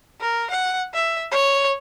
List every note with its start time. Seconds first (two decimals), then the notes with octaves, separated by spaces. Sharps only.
0.21 A#4
0.50 F#5
0.94 E5
1.31 C#5